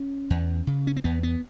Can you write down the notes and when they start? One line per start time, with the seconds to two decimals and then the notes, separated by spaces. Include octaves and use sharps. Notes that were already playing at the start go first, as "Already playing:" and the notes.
Already playing: C#4
0.30 E2
0.67 C#3
0.87 C#4
0.96 C4
1.04 E2 B3
1.23 B3